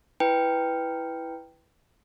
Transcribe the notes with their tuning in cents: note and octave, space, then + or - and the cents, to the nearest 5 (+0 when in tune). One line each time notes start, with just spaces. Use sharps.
E4 +0 B4 +0 G5 +0